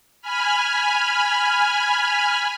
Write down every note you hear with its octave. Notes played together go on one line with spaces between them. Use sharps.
G#5 B5 F6